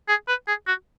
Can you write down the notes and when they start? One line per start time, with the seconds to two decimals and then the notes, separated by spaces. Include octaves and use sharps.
0.08 G#4
0.28 B4
0.48 G#4
0.67 F#4